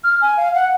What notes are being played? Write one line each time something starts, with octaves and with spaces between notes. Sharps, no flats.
F6
G#5
F5
F#5